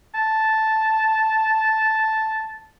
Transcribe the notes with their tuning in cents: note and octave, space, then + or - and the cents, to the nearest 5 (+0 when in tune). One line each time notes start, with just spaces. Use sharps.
A5 -5